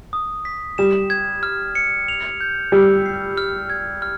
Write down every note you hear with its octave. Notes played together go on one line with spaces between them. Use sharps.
D#6
B6
G3 E7
G#6
F6
C#7
F7
G6
G3 E6
C7
F6
G#6
F6